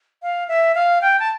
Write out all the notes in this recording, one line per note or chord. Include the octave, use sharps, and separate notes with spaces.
F5
E5
F5
G5
A5